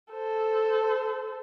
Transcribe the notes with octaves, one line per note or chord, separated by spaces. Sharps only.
A4 C5